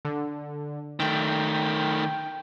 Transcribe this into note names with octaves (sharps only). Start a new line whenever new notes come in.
D3
D#3 A3 G5